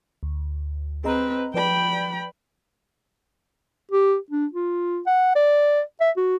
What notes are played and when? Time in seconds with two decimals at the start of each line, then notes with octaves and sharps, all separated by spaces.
0.23 D2
1.04 C4 G#4 B4 D#5 A#5
1.54 F3 B4 D5 G5 B5
3.91 G4
4.31 D4
4.53 F4
5.06 F#5
5.35 D5
6.00 E5
6.17 F#4